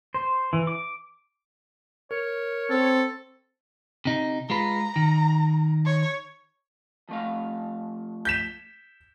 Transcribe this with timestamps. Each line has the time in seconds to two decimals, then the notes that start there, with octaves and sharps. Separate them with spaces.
0.14 C5
0.53 E3
0.67 D6
2.11 A#4 C#5
2.70 C4 A4
4.05 C3 D#4
4.50 G#3 F4 B4 A#5
4.96 D#3
5.86 C#5
7.09 F3 A3 F5
8.25 G6 B6 E7